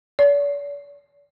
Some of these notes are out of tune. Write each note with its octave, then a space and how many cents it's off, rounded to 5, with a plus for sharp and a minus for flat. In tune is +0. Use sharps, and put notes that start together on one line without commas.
D5 -45